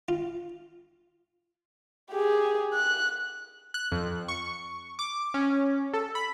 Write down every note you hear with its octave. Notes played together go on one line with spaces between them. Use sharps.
F4
G4 G#4
F#6
F#6
F2
C#6
D6
C#4
A4
B5